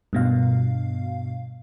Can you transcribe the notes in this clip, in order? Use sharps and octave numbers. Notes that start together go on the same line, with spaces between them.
G2 B2 F5